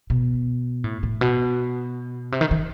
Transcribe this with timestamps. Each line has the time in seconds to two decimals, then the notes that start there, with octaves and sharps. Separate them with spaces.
0.10 B2
0.84 A2
1.03 A2
1.21 B2
2.32 C3
2.41 D#3
2.51 D#3